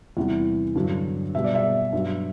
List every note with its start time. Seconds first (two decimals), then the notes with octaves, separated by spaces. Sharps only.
0.17 E2 C3 E3 G3
0.76 G2 D3 F#3
1.35 B2 G3 E5
1.44 D5
1.55 E5
1.93 G2 F#3